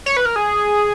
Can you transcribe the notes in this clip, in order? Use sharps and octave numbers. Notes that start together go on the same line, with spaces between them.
C#5
B4
A#4
G#4